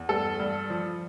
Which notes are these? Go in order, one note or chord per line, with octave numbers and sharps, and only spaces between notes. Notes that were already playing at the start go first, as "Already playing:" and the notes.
Already playing: E2
G2 A4
G2
F3